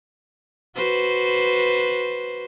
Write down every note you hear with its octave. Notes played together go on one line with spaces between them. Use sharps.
F#4 B4 C5